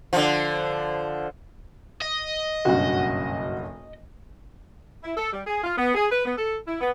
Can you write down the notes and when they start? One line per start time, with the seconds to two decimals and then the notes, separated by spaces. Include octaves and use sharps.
0.13 D3 F3
2.01 D#5
2.65 F#1 B1 G2 F#4 F#5
5.04 E4
5.17 A4
5.32 G3
5.46 G#4
5.64 F4
5.77 B3
5.95 G#4
6.11 B4
6.25 B3
6.37 A4
6.67 E4
6.80 B3